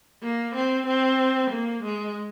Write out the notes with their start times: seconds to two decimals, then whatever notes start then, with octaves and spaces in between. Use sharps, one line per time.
0.23 A#3
0.55 C4
0.87 C4
1.50 A#3
1.83 G#3